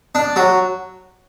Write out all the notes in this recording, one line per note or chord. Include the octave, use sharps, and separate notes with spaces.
D4
F#3